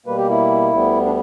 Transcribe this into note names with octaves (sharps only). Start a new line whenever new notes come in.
B2 G3 A#3 B4
G4
E4
D2 D3 G3 B3
D4